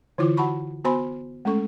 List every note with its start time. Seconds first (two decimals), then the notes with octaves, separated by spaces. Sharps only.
0.18 D3 E3 E4 F4 D6
0.37 F#4 F#5 A5 B5 C#6
0.85 B3 F#4 C5 G#5 B5 C6
1.45 G#3 A3 C#4 A4 C#6